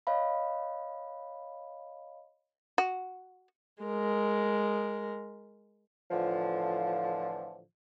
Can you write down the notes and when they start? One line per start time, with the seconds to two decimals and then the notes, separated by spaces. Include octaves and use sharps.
0.07 C#5 D#5 F5 B5
2.78 F#4
3.83 G#3 A#4
6.11 A2 D3 E3 F3